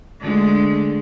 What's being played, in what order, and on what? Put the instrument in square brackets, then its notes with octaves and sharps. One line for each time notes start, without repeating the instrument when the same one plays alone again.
[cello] D3 A3 [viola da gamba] G#3